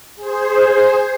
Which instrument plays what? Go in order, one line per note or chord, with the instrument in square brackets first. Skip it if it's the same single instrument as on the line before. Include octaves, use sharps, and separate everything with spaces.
[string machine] G#4 C5